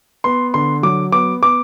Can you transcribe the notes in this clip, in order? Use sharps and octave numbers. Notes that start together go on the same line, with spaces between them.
B3 C6
D3 C6
F#3 D6
B3 D6
B3 D6